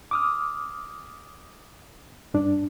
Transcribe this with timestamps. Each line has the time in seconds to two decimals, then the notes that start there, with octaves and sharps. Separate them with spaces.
0.11 D6 D#6 F6
2.34 G2 D4